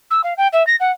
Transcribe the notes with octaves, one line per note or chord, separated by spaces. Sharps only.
E6
F5
G5
E5
A#6
F#5